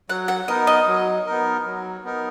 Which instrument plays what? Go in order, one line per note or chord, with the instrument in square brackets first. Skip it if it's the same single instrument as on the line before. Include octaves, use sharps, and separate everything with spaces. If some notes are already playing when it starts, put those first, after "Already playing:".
[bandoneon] F#3 [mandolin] F#5
[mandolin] F#5
[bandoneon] B3 D#4 A#4 [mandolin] D#5
[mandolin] D#5
[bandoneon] F#3
B3 D#4 A#4
F#3
B3 D#4 A#4